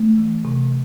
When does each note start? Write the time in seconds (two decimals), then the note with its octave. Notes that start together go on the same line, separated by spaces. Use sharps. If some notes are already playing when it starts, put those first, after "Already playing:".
Already playing: A3
0.17 E3
0.45 C3